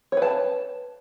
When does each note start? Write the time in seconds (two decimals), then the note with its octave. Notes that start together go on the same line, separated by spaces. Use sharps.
0.12 C#5
0.17 B4
0.22 A5